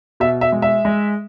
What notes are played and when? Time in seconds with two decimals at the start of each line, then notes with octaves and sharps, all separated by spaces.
0.20 B2 E5
0.41 E5
0.52 G#3
0.62 E5
0.85 G#3